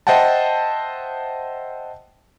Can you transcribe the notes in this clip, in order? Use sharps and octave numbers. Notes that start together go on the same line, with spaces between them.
C5 D#5 E5 F#5 G5 A5